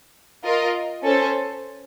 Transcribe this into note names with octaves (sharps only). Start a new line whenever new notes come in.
F4 A#4 D#5
C#4 A4 C5